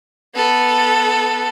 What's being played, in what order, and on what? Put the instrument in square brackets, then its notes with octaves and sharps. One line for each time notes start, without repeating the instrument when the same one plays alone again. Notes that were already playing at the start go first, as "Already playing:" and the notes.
[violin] B3 A4